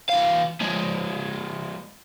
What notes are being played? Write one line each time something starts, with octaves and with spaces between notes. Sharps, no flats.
E3 F5
F3 G#3